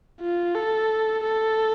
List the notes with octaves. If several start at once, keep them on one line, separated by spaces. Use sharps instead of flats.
F4
A4
A4